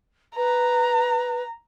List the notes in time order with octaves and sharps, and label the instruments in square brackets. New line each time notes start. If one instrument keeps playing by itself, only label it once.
[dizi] B4 [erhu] A#5